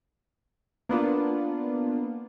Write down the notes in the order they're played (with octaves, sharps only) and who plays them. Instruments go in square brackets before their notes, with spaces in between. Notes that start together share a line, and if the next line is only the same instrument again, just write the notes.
[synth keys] A#3 B3 D4 F4